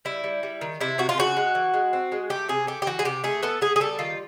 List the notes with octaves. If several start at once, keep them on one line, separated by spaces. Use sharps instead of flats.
G3 E4
G3
G3
D#3
C3 E4
C3 F#4
F4
C#3 F#4
G#3
E3
G#3
C4
G#3
A3 G4
C3 G#4
A3 G4
G4
E3 F#4
G#4
C3 G4
A3 G#4
B3 A4
B3 G#4
G#4
G3 A4
D#3 F4